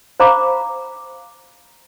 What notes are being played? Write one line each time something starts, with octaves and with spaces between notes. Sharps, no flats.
C5 F5 A#5 B5 D6